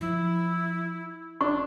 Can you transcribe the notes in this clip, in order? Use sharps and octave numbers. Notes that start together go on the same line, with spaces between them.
F3 E4 F4
F1 D4 C#6